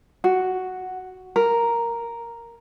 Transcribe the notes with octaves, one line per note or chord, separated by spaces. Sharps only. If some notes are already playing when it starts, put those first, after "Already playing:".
F#4
A#4